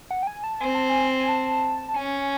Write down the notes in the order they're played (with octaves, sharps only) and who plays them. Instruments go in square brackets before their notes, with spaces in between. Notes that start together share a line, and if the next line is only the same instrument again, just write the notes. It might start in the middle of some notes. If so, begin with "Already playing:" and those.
[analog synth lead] F#5
G5
G#5
A5
[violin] C4 [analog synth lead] G#5
[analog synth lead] A5
G#5
G#5
A5
A5
[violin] C#4 [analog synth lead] G#5